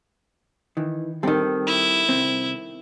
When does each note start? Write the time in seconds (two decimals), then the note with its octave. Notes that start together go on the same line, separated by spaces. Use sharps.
0.77 D#3 E3
1.23 D#3 G3 C4 G4 A4
1.67 E4
2.09 C2 C4